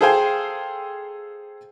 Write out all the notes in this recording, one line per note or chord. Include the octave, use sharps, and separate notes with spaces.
G#4 A4 C5 F5 G5 G#5